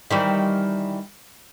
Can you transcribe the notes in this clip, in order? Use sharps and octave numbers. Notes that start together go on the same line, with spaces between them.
D#3 E3 G3